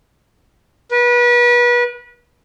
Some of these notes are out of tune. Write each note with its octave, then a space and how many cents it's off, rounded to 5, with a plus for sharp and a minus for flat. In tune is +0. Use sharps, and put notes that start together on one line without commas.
B4 -30